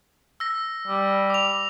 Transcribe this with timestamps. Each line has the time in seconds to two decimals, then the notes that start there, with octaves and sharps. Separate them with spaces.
0.40 E6 A#6
0.87 G3
1.30 D6 F7